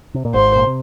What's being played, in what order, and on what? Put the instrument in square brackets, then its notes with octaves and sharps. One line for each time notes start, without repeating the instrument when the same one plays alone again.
[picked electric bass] C3
A#2
[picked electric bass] G#1 G#2 [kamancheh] C5
[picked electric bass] A#2
C3